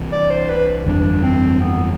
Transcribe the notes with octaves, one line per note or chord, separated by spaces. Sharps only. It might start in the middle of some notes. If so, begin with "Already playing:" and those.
Already playing: C2 C3 E3
D5
C5
B4
G1 F2 E3 G3 D4
C4
B3